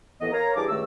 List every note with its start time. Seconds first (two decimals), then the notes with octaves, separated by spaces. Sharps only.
0.21 D#2 A2 E3 B3 D#5
0.32 A#4 C#5 F5 A#5
0.56 G2 E3 G4 G#4 A5 D6
0.69 C#2 G2 D#3 A3 E6